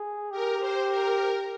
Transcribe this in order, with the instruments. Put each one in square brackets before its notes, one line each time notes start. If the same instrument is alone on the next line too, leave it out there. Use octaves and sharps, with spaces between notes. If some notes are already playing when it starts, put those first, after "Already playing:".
Already playing: [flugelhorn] G#4
[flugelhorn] G4 [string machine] A#4
[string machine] C5
A#4